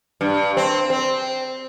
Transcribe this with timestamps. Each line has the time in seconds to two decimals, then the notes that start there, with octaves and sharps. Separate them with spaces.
0.21 G2
0.57 C4
0.90 C4